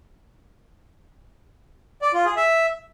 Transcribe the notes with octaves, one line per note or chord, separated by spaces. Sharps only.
D5
F4
G#4
E5